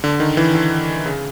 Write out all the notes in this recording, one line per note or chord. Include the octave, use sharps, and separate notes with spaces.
D3
D#3
E3
D3
C#3